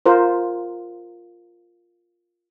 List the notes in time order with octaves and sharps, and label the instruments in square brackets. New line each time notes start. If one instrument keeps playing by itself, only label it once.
[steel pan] F4 A#4 C5